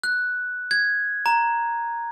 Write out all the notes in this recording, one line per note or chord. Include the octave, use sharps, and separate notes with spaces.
F#6
G#6
A#5